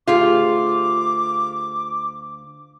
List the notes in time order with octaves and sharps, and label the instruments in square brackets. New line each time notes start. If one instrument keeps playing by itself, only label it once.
[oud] D2 G4 G#4 [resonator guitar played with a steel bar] F4 [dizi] D6